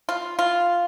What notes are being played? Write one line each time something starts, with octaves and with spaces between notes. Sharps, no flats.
F4
F4